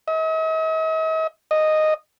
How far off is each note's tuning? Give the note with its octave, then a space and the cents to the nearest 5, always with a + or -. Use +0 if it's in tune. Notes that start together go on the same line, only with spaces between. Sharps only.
D#5 +45
D#5 -5